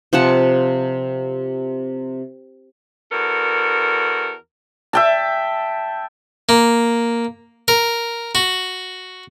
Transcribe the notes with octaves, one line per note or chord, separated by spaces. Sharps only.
C3 F3 F#5 A5
E2 F#4 A4 A#4
E5 G5 A5
A#3
A#4
F#4